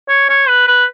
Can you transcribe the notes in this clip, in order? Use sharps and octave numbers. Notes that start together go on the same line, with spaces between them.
C#5
C#5
B4
B4